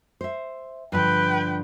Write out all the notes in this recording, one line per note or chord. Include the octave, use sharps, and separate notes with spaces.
C5 E5
G2 D3 F3 B4 G5